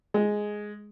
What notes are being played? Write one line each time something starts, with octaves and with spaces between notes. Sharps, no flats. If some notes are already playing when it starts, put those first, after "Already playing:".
G#3